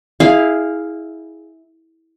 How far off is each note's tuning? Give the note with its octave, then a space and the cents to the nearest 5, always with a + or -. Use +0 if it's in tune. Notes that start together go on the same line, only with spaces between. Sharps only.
E4 -20 G#4 +0 F5 +0